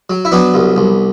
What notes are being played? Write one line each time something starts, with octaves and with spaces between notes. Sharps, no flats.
F#3
E4
F#3 B3 D4
C2
C2